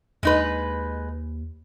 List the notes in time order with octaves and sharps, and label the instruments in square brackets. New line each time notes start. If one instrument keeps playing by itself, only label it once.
[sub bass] D#2 [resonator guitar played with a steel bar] G#3 D#4 B4